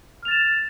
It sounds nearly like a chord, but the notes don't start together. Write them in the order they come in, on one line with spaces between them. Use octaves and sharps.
F6 F7 A6 E7